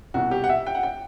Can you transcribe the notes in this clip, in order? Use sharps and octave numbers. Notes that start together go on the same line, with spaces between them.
C2 B2 F#4
G4
F#5
E5
G5
F#5
G5